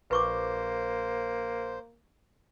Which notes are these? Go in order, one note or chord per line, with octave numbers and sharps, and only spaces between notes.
A#1 A#3 B4 C5 C#6 D6